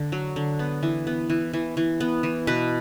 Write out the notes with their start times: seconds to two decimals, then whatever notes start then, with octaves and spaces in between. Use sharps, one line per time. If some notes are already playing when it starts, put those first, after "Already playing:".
Already playing: D3
0.12 F#3
0.36 D3
0.59 B3
0.83 E3
1.07 B3
1.30 E3
1.53 E3
1.77 E3
2.00 B3
2.23 E3
2.47 B2 B4